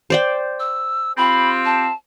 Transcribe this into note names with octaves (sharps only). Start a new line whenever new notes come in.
C5 D5 G5
E6
C4 F4 G4 B5
A5